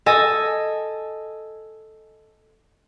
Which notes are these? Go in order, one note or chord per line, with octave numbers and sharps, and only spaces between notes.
A4 D#5 G#5